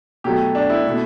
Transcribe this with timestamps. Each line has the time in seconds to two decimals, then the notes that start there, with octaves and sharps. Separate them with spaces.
0.24 B2 F#3 A3 G4
0.55 D4
0.70 E4
0.84 B2 A3